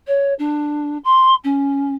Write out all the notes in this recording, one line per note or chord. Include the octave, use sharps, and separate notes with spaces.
C#5
D4
C6
C#4